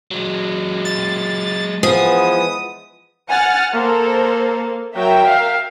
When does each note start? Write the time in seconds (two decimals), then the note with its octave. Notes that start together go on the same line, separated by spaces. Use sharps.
0.11 F#3 G#3
0.85 A6
1.83 E3 F3 G#3 B3 D#6
3.29 F#5 G#5 F6 A6
3.73 A#3 A4 A#4 C5
4.95 F#3 A#4 E5 G5
5.26 F5